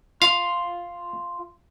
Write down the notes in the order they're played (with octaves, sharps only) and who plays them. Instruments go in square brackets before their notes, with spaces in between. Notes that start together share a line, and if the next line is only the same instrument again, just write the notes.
[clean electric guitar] F4 [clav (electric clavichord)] F5